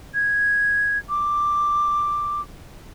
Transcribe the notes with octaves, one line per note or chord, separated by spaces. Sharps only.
G#6
D6